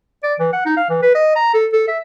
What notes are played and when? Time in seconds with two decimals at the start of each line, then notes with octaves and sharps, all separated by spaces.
0.23 D5
0.39 E3
0.53 F#5
0.65 D#4
0.77 F5
0.89 E3
1.02 B4
1.15 D#5
1.36 A#5
1.54 A4
1.73 A4
1.88 E5